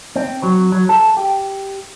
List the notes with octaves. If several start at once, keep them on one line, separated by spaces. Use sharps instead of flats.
C4
F#3
F#3
A4
G4